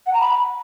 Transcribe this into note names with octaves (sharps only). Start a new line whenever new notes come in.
F#5
A#5
B5